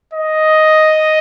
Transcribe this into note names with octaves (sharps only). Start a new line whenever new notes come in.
D#5